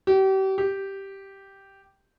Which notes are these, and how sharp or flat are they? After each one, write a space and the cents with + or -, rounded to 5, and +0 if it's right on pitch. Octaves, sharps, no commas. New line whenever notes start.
G4 -35
G4 -5